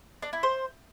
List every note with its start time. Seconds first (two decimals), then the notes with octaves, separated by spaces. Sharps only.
0.22 D4
0.33 E4
0.43 C5